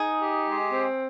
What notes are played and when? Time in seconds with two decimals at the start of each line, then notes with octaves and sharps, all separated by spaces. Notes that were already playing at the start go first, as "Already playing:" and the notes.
Already playing: D#4 G#4
0.18 G4
0.45 G#3
0.73 C4